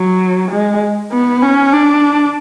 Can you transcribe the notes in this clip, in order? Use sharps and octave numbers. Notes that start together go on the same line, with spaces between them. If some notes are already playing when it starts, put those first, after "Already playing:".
Already playing: F#3
G#3
B3
C#4
D4